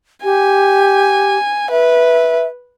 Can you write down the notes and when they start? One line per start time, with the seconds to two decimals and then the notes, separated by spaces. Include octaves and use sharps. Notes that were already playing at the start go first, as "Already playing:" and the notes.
0.24 G4 G#5
1.71 B4 E5